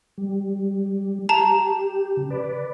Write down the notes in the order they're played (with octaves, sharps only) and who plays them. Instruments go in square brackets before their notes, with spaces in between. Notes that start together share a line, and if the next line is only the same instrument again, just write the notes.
[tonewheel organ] G3
[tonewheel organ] G4 [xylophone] A5 A#5
[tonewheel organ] C#3
B4 D5